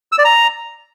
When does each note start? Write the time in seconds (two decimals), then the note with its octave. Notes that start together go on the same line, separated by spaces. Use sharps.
0.12 E6
0.18 D5
0.25 A#5